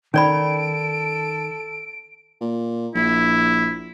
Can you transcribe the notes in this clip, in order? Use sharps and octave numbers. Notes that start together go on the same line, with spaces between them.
D#3 C#4 A4 D5 B5 D7
A#2
A#1 E4